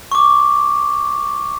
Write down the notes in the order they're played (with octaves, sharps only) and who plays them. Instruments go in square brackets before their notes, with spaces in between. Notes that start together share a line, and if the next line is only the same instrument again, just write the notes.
[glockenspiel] C#6 D6